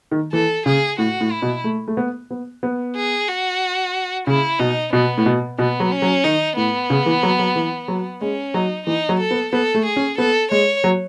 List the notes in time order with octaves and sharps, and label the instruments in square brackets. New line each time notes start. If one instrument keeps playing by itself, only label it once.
[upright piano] D#3
[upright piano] E3 [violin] A4
[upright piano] C#3 [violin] G#4
[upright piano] A2 [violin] F#4
[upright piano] A2
[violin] E4
[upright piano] B2
A3
A3
B3
B3
B3
[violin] G#4
F#4
[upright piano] C#3 [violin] E4
[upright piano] B2 [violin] D#4
[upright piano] B2 [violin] B3
[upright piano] A2
B2
[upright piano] B2 [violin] B3
[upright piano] F#3
[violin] C#4
[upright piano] F#3
[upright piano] D#3 [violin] D#4
[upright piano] A2 [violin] B3
[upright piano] C#3
E3
F#3
F#3
E3
F#3
[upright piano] G#3 [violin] C#4
[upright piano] F#3 [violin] D#4
[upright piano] E3 [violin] D#4
[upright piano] F#3
[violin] A4
[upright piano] B3
[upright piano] B3 [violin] A4
[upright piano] A3
[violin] G#4
[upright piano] C#4
[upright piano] B3 [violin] A4
[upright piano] G#3 [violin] C#5
[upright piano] F#3